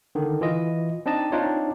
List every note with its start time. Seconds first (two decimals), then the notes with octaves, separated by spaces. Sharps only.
0.15 D3 D#3
0.41 E3 F4 D#5
1.06 C4 D4 D#4 D#5 A5
1.32 C4 D4 D#4 F4 C#5